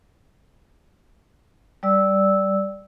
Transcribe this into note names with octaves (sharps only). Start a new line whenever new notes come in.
G3 D5 E6